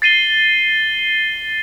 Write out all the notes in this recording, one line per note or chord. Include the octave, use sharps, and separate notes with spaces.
A6 C7 D#7 G7